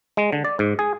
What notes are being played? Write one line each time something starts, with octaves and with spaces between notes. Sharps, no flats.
G#3
D3
D5
G#2
G#4